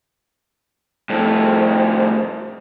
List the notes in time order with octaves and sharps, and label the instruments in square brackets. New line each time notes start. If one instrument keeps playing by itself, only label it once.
[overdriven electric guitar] F2 A2